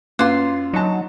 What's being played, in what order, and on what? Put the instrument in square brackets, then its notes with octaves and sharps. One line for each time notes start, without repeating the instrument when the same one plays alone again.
[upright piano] F#2 [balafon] A#3 B4 D6 [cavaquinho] F4 C6
[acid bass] F#3 [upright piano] D#4 A5